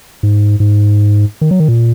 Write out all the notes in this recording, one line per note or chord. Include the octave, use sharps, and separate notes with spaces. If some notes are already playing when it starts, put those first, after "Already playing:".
G#2
G#2
D#3
F#3
D#3
A#2